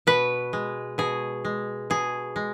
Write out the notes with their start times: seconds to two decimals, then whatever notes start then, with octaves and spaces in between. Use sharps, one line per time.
0.07 B2 B4
0.53 G#3
0.98 B2 G#4
1.45 G#3
1.90 B2 G#4
2.36 G#3